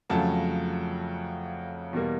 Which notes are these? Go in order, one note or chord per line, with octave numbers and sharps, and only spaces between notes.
F2 C#3 F#3 A3 A5
E2 B2 G3 A#3